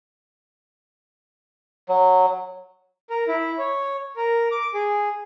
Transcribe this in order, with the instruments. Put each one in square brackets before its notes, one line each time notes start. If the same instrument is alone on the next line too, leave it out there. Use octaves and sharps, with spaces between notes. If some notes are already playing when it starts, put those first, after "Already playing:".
[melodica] F#3
[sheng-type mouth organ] A#4
E4
C#5
A#4
D6
G#4